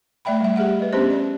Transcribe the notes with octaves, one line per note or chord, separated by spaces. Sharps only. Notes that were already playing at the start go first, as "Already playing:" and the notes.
A3 D5 E5 G5 B5
G3 E5
G4 G#4 E5 F#5
B4 D#5
B3 C#4 D4 G4 C5
D5